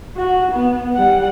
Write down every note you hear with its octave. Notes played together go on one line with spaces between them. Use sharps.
F#4
B3
G3 F#5